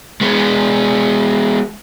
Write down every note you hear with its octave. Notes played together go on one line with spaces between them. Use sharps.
G#3 B3